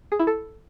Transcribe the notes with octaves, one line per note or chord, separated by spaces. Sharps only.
G#4
E4
A4